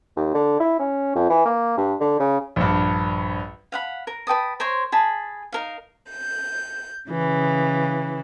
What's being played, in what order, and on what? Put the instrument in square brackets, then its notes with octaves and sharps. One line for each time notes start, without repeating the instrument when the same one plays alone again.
[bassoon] D#2
D3
E4
C#4
F2
E3
A#3
G2
D3
C#3
[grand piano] A#1 G2
[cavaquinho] F5 F#5 B5
A#4
B4 G5 A5 D#6
A#4 C5 C#5 C6
G#4 A5 B5
D#4 A#4 F5
[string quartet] G6
C#3 E3